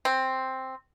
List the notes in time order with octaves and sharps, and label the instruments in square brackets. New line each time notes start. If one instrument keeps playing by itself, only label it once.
[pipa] C4